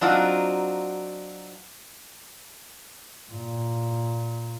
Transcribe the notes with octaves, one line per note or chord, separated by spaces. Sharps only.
F#3 C4 D4 D#4 F4 F#4
A#2